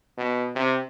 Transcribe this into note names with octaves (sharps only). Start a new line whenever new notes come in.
B2
C3